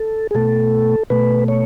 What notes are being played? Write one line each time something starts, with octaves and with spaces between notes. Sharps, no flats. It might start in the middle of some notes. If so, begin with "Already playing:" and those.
Already playing: A4
G#4
B2 A3 A4
B2 A3 B4
C#5